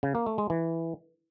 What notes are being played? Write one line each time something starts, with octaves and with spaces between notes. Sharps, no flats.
C#3
A#3
A3
G#3
E3